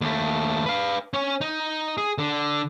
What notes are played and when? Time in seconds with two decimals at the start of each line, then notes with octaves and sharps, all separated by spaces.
0.01 D#2 A3
0.66 B4 F5
1.14 C#4 C#5
1.41 D#4
1.98 G#4
2.18 D3